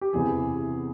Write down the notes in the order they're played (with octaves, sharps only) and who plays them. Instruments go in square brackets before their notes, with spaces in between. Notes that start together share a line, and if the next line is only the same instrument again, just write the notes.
[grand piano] G4
E2 C3 E3 G#4